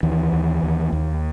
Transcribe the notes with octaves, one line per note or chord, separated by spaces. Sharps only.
D#2 E3
D#2
D#2
D#2